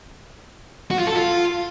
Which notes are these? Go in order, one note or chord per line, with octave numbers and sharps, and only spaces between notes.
F#4
F4
A4
F4